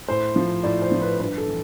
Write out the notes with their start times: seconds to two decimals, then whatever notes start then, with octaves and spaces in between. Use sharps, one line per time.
0.08 A2 C5
0.36 F3
0.63 A2 D5
0.82 C5
0.92 F3
1.01 B4
1.19 G2 B4
1.38 A4
1.48 E3